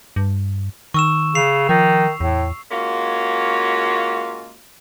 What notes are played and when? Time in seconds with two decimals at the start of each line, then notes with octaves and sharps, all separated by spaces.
0.16 G2
0.94 D#3 C#6 E6 E7
1.35 C#3 C7 F7
1.69 D#3 F3
2.20 E2 A2
2.71 G#3 A#3 C#4 F4 F#4